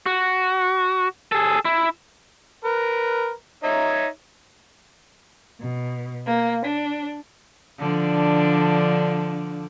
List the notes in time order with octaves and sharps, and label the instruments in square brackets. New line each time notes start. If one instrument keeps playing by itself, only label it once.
[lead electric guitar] F#4
G#4 A4
E4
[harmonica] A#4 B4
D#4 C#5 E5
[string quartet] B2
A#3
D4
[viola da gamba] D3 F3 D4